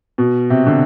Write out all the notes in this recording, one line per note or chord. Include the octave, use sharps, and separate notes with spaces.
B2
C3
D3